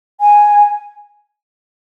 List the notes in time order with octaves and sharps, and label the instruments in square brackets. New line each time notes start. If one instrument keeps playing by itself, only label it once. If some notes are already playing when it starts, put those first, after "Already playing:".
[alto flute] G#5